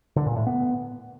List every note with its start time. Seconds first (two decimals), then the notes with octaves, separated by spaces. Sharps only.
0.16 D3
0.26 A#2
0.36 A2
0.47 B3